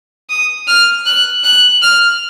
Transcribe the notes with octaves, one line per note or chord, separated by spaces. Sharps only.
D#6
F6
F#6
F#6
F6